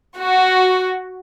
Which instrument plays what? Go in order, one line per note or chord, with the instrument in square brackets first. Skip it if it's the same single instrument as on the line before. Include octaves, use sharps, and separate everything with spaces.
[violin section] F#4